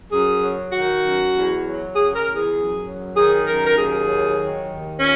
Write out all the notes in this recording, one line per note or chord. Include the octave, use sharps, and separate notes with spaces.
F#2 G#4
F#3
D#3 F#4
F#2
E2
F#3
C#3 G#4
A#4
E2
G#4
F#2
F#3
D#3 G#4
F#2 A#4
A#4
D#2 G#4
F#3
D#3
D#2
A#2 C#4